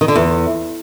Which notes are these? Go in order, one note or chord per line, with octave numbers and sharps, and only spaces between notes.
D#3
D3
E2